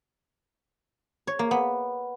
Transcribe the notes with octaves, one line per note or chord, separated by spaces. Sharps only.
C#5
A#3
B3